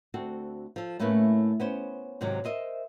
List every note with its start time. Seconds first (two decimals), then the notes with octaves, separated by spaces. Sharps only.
0.14 D2 C4 F#4 A4
0.76 F3 A4
0.99 A2 A3 A#3 C#4 E4 B4
1.60 B3 C#4 C5
2.21 G#2 C3 D#3 F#3
2.44 A#4 C5 D#5 E5